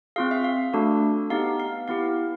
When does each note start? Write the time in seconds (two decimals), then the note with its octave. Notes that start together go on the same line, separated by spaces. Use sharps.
0.16 C4 F4 G#4 F5
0.31 E5
0.44 F5
0.73 A3 D4 F#4 A4
1.30 B3 D#4 G4 F5
1.60 F5
1.88 B3 E4 G4 F5